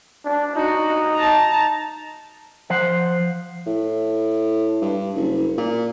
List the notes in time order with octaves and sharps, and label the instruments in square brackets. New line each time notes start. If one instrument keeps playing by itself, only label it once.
[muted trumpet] D4
[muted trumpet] D#4 [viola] F#4
[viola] A5 A#5
[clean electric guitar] F3 C5 F#5
[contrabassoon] A2
G2
F#1
A#2